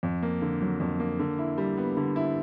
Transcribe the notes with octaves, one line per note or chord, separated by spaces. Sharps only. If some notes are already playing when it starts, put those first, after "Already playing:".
F2
A#3
D3
F#3
F2
A#3
D3
E4
G3
B3
D3
E4